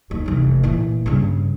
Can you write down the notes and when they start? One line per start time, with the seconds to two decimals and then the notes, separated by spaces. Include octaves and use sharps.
0.11 D#2
0.26 F1 E3
0.63 A#2 E3
1.06 G2 C#3